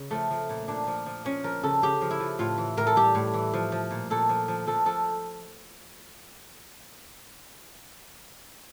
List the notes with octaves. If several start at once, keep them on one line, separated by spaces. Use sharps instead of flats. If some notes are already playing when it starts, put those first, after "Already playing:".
Already playing: C#3
F3 A3
F3
A#2
A#2 D4
F3
F3
F3 C#4
F3 A#4
C#3 A4
C#3 G4
F3
E4
F3
A2 F4
E3
A2 A#4
A4
G3 G4
A2
E3
F3
F3
A#2
A#2 A4
F3
F3
F3 A4
F3 A4